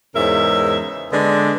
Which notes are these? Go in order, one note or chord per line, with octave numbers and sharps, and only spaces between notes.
E2 G#2 C#3 A#4 E5
D3 G#3 B3 D4